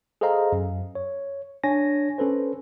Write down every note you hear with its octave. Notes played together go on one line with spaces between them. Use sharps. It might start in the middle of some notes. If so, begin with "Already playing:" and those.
G#4 A4 C5 D#5 F5 A#5
F#2
C#5
D4 C#5 G#5 A#6
C#4 A4 B4 C5